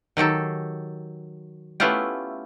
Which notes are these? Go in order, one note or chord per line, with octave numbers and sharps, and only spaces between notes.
D#3 F#3 G4 A4
A3 B3 C#4 E4 F4 G4